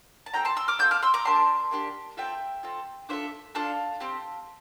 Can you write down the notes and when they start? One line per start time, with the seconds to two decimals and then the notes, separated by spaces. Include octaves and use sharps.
0.26 A5
0.34 C4 F4 A4 G5 A#5
0.45 A5 C6
0.57 C6 E6
0.68 D6 F6
0.79 C4 F4 A4 E6 G6
0.91 D6 F6
1.02 C6 E6
1.14 A#5 D6
1.25 A#3 D4 G4 A5 C6
1.71 A#3 D4 G4
2.17 C4 F4 A4 E5 G5
2.63 C4 F4 A4
3.09 D4 F4 A4 C5 E5
3.55 D4 F4 A4 F5 A5
4.00 C4 G4